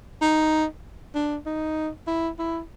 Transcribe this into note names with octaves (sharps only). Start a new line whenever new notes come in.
D#4
D4
D#4
E4
E4